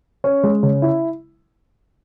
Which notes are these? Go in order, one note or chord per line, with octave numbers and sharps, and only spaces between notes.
C#4
G#3
C#3
E4